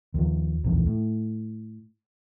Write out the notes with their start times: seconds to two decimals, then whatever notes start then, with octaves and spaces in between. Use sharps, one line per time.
0.14 D#2 F3
0.64 D1 A#1 E2
0.86 A2